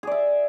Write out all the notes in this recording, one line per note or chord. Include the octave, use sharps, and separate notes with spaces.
G#4 D5 E5